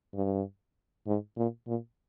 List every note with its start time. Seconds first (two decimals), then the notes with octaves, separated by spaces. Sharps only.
0.15 G2
1.07 G#2
1.37 A#2
1.67 A#2